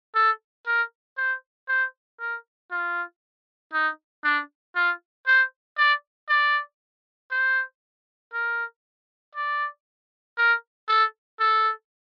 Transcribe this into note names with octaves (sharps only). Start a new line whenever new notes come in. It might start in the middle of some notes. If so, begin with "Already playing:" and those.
A4
A#4
C5
C5
A#4
F4
D#4
D4
F4
C5
D5
D5
C5
A#4
D5
A#4
A4
A4